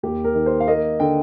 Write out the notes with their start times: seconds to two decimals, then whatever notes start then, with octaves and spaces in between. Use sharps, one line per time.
0.03 D#2 G4
0.24 A#4
0.35 D#3
0.46 C5
0.60 F5
0.68 A#3 D#5
1.00 D3 G5